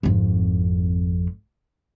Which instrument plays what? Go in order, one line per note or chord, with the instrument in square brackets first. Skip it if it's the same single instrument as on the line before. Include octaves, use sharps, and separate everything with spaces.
[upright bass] G#1 F2